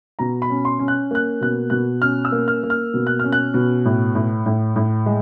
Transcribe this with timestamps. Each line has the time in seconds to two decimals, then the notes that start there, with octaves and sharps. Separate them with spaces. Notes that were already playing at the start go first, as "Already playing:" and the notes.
0.19 B2 A#5
0.42 B5
0.50 C#4
0.65 C6
0.79 C#4
0.88 F#6
1.11 A#3 F#6
1.41 B2 F#6
1.70 B2 F#6
2.02 C#4 F6
2.25 E6
2.32 A#3
2.48 F6
2.63 A#3
2.70 F6
2.94 B2
3.07 F#6
3.19 C#4 F6
3.32 F#6
3.54 B2
3.85 A2
4.15 A2
4.46 A2
4.76 A2
5.06 G#3